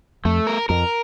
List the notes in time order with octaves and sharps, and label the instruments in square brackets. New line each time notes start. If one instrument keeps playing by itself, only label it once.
[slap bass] F2 [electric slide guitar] A3
[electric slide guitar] A#4
[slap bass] F2 [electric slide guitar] A#4